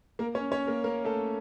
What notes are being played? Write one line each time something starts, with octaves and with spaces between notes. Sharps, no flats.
A#3 A#4
C#4 C#5
C#4 C#5
A#3 A#4
A#3 A#4
A3 A4